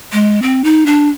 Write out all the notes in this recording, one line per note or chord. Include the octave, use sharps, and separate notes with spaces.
G#3
C4
D#4
D4